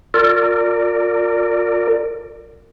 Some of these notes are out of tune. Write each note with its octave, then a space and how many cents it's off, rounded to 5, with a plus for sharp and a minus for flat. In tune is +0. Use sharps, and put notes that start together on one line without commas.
F4 +30 A#4 -35 D5 -5